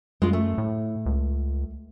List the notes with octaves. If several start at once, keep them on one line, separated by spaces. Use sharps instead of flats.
F#2 G#3 F4
A3
A2
C#2